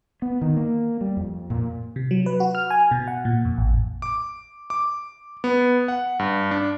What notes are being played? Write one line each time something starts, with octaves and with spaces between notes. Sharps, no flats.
B3
D#3
A#3
G3
F2
A#2
C3
F#3
B4
F#4
F6
G#5
B2
F#5
A#2
F2
A1
D6
D6
B3
F#5
G2
D4